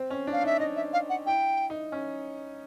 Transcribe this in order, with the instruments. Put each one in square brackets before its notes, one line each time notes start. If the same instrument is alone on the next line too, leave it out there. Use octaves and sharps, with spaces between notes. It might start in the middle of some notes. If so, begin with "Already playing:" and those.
Already playing: [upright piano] C4
C#4
D4
[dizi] F5
[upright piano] D#4 [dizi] E5
[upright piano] D#4 [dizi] D#5
[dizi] E5
F5
F#5
[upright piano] E4 [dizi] G5
[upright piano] D#4
C#4